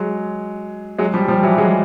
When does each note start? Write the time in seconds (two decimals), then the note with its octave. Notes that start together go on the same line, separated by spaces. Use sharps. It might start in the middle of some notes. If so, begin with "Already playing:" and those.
Already playing: F#3 G#3
0.99 F#3 G#3
1.14 F3 G3
1.28 F3 G3
1.43 E3 F#3
1.58 F#3 G#3